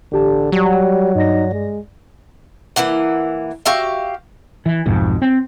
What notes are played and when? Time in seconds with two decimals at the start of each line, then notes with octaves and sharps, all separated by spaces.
0.12 A1 D3 G4 A5
0.52 F#3 G3
1.15 G2 D#4 D5 A#6
1.52 G#3
2.76 E3 A#3 E4 F#5
3.66 F#4 G4 E5 F5
4.66 E3
4.86 B1 F2 G#2
5.22 C4